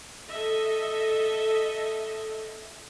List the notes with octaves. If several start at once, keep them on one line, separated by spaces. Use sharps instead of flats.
A4 D#5 E5